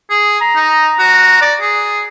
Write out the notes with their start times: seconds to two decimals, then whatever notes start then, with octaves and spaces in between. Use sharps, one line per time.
0.10 G#4
0.41 A#5
0.56 D#4
0.99 F#4
1.41 D5
1.61 G#4